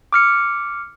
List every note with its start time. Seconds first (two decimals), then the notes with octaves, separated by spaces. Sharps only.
0.13 D6 F6 C#7